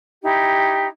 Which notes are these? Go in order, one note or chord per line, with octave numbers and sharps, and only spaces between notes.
D#4 E4 G4